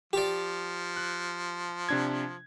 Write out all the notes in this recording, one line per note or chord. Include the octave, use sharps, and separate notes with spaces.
F3 G4 D5
F#6
C3 D4 G#6